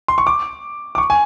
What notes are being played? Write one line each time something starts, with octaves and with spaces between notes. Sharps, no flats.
C6
C#6
D6
D6
C#6
G#5